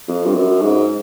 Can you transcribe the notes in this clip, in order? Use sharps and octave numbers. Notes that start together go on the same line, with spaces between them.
F2
G2
F#2
G#2